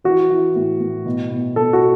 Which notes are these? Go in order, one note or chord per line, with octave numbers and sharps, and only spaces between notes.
E3 F#4
E3
A2
A2
B2
B2
B2 A4
F#4